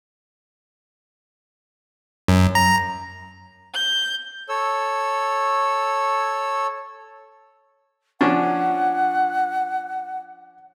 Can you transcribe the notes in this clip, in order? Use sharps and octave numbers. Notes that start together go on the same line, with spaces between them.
F#2
A#5
G6
A4 C#5 E6
F3 C#4 D4 F#5